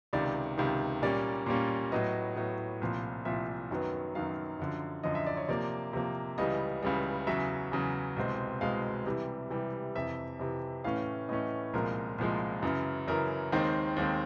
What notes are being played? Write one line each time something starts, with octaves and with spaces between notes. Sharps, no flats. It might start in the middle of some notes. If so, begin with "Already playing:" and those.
C#2 C3 D#3 D5
C#2 C3 D#3
A#2 G3 A#3 C#4 D5
A#2 G3 A#3 C#4
A2 F#3 B3 D#5
A2 F#3 B3
C2 A#2 F3
C2 A#2 F3 E5
F#2 D#3 F#3 B3
F#2 D#3 F#3 B3 F5
F#2 D3 F3
F#2 D3 F3 D#5
E5
D5
C#5
C3 F3 A#3 D5
C3 F3 A#3
C#2 C#3 E3 G3 D#5
C#2 C#3 E3 G3
E2 C#3 F#3 E5
E2 C#3 F#3
C2 B2 G#3 C4
C2 B2 G#3 C4 F5
C3 E3 G3
C3 E3 G3
F2 C3 E3 E5
F2 C3 E3
A2 E3 A3 C#4 F5
A2 E3 A3 C#4 D#5
C2 A#2 F3 G#3 A#4
C2 A#2 F3 G#3
F#2 C#3 E3
F#2 C#3 E3 A#4
D#2 D#3 G#3 C4
D#2 D#3 G#3 C4